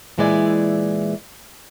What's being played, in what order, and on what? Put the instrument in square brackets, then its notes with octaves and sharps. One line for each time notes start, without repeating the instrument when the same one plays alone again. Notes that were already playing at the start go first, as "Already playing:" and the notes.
[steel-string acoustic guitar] A#2 E3 G#3 E4 D5 G#5